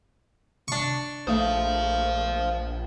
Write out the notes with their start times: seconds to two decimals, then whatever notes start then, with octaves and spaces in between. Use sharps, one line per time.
0.68 D4 C#6
1.27 A#1 A3 C5 F5 D#6